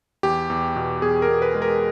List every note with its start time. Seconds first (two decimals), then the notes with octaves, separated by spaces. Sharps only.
0.23 E2 G4
0.50 E2
0.76 B2
1.02 E2 G#4
1.22 A#4
1.28 B2
1.42 B4
1.55 G#3
1.62 A#4